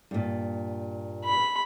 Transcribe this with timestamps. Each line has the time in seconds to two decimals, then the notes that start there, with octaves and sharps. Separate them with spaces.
0.11 G2 A#2
1.25 B5